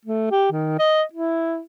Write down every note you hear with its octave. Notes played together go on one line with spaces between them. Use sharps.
A3
G4
D#3
D#5
E4